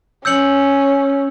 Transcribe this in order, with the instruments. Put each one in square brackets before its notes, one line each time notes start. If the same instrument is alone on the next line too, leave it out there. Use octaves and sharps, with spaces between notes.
[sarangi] C#4 [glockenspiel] E6 G6 C#7 F#7